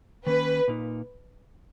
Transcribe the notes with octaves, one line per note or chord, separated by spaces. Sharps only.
D#3 A#3 C#4 B4
A#2 A#3 D#4